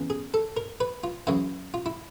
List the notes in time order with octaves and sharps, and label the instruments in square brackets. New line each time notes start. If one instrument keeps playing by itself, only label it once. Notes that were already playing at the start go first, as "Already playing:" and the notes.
Already playing: [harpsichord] E2 C#3 E3
G#4
A4
A#4
B4
F4
F#2 C#3 E3 E4
F4
E4